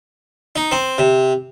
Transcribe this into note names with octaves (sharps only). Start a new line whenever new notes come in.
D#4
C4
C3